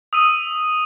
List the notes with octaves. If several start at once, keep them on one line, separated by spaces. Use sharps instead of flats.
D#6 E6 D#7